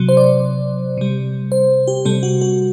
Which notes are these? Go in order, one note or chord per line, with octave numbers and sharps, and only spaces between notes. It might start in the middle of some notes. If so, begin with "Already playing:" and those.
Already playing: C3 F#3
C5
D5
C3 G3
C5
G4
C3 G3 A4
F#4
F#4